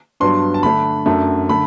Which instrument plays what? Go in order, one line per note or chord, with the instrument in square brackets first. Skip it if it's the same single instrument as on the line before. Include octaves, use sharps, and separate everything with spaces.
[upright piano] G2 F#3 B3 D4 C6
A5
D3 A3 D4 B5
F#2 F#3 A3 D4
D3 A3 B5